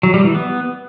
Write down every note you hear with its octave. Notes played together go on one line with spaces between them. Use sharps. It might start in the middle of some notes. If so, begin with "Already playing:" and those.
F#3
G3
E3
B3